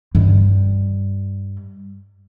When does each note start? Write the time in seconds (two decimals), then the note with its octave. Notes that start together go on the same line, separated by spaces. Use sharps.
0.15 G2 G3